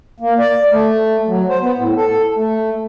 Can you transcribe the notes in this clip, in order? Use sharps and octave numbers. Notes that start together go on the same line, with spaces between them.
A#3
D5
A3
F#3
C5
B3
A2
A4
A3